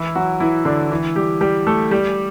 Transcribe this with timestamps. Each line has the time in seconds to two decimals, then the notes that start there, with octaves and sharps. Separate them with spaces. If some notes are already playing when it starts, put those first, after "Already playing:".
Already playing: E3 E4
0.15 F#3 F#4
0.40 E3 E4
0.65 D3 D4
0.91 E3 E4
1.16 G3 G4
1.41 G3 G4
1.67 A3 A4
1.91 G3 G4